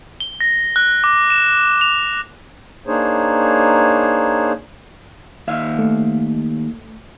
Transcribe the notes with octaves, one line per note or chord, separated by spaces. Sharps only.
G7
A#6
F#6
D6
E7
F7
A#3 D4 D#4 G#4 C5 C#5
D#2 E5 F5
A3